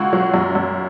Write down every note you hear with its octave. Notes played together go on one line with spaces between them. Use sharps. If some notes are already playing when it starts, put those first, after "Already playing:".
Already playing: C#2 F#4
F#3
F#2
F#2